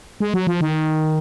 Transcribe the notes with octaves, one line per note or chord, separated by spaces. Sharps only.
G#3
F#3
F3
D#3